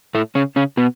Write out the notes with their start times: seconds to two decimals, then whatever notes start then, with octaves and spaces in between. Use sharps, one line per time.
0.15 A2 A3
0.35 C#3 C#4
0.56 C#3 C#4
0.77 B2 B3